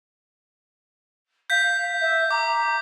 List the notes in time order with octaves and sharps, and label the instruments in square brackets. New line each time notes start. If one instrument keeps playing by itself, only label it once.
[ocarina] F5 [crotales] G6 B6
[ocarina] E5
[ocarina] A#5 [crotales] D6